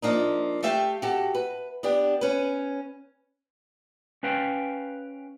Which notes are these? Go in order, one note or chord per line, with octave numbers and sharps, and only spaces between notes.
F3 A#3 D4 D#4
A3 G4 E5 F5 G5
F#4 G4 A4
B4
B3 D4 G4
C#4 B4
C#4 B4 F5 G5